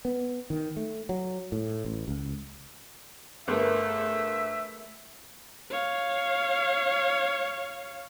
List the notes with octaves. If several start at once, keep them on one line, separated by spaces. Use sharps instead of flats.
B3
D#3
A3
F#3
A2
A1
C#2
G1 A3 G#4 A#4 B4 E5
C#5 F5